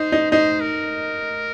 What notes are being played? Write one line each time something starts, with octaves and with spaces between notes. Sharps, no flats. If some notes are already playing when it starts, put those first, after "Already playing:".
Already playing: D#4 C5
D#4
D#4 C5
A#4